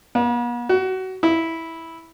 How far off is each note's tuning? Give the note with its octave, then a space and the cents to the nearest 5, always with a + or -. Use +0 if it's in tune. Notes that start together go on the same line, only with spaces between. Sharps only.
B3 -45
F#4 +25
E4 -10